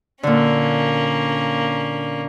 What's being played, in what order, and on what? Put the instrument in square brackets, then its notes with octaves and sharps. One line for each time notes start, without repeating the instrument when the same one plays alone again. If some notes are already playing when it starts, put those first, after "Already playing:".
[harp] A#2 D3 [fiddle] A#3 C#4